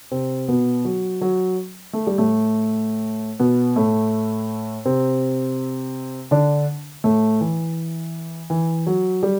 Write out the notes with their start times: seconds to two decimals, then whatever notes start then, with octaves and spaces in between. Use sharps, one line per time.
0.11 C3 C4
0.48 B2 B3
0.85 F#3
1.21 F#3
1.93 A3
2.07 G3
2.18 A2 A3
3.39 B2 B3
3.76 A2 A3
4.85 C3 C4
6.31 D3 D4
7.04 A2 A3
7.41 E3
8.50 E3
8.87 F#3
9.23 G3